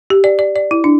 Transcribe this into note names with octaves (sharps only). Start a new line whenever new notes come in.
G4
D5
D5
D5
E4
D4